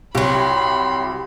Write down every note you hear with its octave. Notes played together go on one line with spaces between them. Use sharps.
C2 F#3 G4 B5 C6